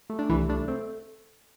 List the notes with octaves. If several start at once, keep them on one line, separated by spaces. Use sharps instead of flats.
A3
D4
C2 E3 E4
A3 D4
A3 C4